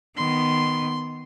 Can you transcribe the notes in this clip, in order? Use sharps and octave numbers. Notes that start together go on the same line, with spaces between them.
D#3 B3 C6